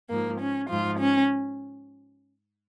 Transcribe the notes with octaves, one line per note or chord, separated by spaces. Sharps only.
G#2 F3 A#3
C#4
G#2 F3 F4
C#4